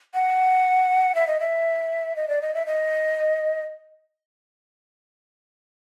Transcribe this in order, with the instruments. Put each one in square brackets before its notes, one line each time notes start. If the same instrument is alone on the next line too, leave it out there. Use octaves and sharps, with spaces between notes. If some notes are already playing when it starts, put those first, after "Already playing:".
[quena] F#5
E5
D#5
E5
D#5
D5
D#5
E5
D#5